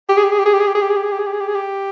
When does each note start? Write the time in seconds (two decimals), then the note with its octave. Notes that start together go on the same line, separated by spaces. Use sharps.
0.09 G4
0.17 G#4
0.23 G4
0.32 G#4
0.39 G4
0.45 G#4
0.53 G4
0.60 G#4
0.67 G4
0.75 G#4
0.81 G4
0.90 G#4
0.96 G4
1.04 G#4
1.12 G4
1.19 G#4
1.26 G4
1.33 G#4
1.40 G4
1.48 G#4
1.55 G4